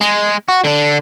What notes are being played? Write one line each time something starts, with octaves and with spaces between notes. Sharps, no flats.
G#3
F#4
D3 D4